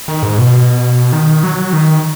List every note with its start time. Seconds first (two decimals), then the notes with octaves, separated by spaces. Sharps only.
0.08 D#3
0.23 G#2
0.38 B2
1.12 D#3
1.43 F#3
1.73 D#3